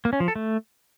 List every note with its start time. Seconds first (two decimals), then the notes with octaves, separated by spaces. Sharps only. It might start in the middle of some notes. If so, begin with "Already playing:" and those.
0.05 A#3
0.13 C#4
0.20 F3
0.28 A4
0.36 A3